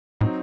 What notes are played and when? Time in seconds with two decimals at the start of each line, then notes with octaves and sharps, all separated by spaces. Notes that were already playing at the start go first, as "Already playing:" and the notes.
0.21 A2 F#3 C4 D#4